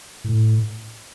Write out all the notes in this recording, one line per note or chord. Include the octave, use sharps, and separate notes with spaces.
A2